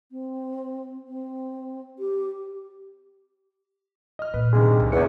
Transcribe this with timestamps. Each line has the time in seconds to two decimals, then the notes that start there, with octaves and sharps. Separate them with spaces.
0.12 C4
1.08 C4
1.99 G4
4.19 D#5 F6
4.34 A#2 B4
4.53 G2 C3 D#3 G#3
4.79 C#2 D3
4.92 G1 E2 C#7